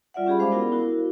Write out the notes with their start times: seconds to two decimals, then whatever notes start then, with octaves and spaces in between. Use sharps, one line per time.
0.14 G3 F4 D5 E5 F#5
0.26 C#4 G4 G#4 B5
0.39 G#3 C5 F5 B5 D6
0.52 B3 E4 F#4 A#4
0.72 E4 F#4 A#4